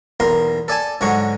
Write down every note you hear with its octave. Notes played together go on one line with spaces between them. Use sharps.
B1 E2 A#4 C6
A4 D5 G#5 A5
G#2 D3 F#3 G#3 C#6